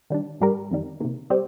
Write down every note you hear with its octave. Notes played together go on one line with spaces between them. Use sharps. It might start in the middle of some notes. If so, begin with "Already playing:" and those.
D#3 G3 D4
G#2 G3 D4 G4 A#4
F2 D#3 G3
C3 D#3 A#3
G3 C4 G4